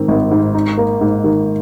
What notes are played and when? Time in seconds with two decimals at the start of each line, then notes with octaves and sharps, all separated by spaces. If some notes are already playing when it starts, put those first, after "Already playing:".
Already playing: G#2 D#3 C4
0.08 G#1
0.31 G#2
0.54 D#4
0.78 A#3
1.01 G#2
1.24 D#3